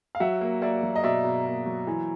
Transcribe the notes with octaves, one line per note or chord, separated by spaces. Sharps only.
F5
F#3 E5 F#5
A#3
A#3 D5 E5
F#3
D#5
B2 D5 E5
B2
A#3
F#3
E3